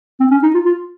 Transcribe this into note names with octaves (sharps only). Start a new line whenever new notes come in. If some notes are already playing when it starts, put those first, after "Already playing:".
C4
C#4
D#4
F4
F4